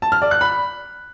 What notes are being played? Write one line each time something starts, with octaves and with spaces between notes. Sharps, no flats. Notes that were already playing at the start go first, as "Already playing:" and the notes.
A5
F6
D5
F#6
B5